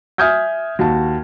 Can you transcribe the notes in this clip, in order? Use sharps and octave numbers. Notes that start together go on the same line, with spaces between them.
E5 G#5 D#6 F6 G6 G#6
D#2 F#4 A5